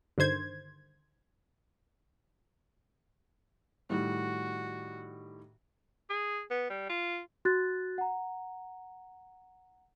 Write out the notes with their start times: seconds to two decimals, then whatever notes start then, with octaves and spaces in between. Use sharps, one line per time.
0.18 G2 D3 D#3 C5 G#6
3.90 A2 D#3 G3 F#4
6.10 G#4
6.51 B3
6.70 G3
6.89 F4
7.45 F#4 F#6 A6
7.98 F#5 A#5